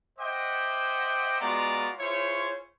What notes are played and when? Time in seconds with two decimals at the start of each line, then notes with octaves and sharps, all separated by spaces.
0.19 C5 D#5 E5 F#5 G5 D6
1.41 G#3 B3 F4 F#4 D5 A#5
1.99 E4 F4 G#4 C5 C#5